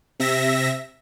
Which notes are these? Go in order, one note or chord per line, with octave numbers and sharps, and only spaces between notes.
C3 E5 A#6